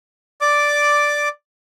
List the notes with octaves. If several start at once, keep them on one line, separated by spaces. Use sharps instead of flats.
D5 D6